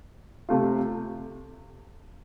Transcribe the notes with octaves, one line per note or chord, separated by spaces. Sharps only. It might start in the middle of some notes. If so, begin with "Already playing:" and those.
C3 A3 F4